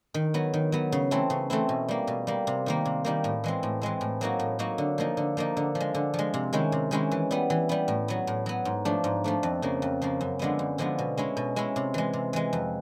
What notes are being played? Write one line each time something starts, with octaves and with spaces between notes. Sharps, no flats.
D#3
F#3 B3
D#3
F#3 B3
C#3
E3 A3 C4 E4
C#3
E3 A3 C4 E4
B2
G3 A#3
B2
G3 A#3
C3
D#3 G3 A#3
C3
D#3 G3 A#3
A2
E3 G#3 C4
A2
E3 G#3 C4
A2
F#3 A#3 D#4 F#4
A2
F#3 A#3 D#4 F#4
D3
F3 A#3 D#4
D3
F3 A#3 D#4
D3
F3
G#3
D3
F3
G#3
C3
D#3 G#3 C#4 E4
C3
D#3 G#3 C#4 E4
E3
G3 B3
E3
G3 B3
A2
F#3 B3
A2
F#3 B3
G#2
F3 A3 D4
G#2
F3 A3 D4
F2
C#3 F3 A#3
F2
C#3 F3 A#3
F#2
D3 F3 G#3 B3
F#2
D3 F3 G#3 B3
B2
G#3 C#4 E4
B2
G#3 C#4 E4
C3
E3 G#3
C3
E3 G#3
F2